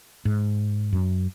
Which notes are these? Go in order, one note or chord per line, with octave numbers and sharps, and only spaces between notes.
G#2
F#2